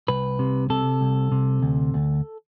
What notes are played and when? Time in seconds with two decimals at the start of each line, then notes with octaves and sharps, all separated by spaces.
0.08 C2 B4
0.39 C3
0.70 C3 A4
1.01 C2
1.32 C3
1.62 D2
1.94 D2